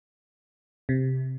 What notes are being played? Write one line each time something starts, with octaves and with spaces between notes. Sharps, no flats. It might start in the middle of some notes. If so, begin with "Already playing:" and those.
C3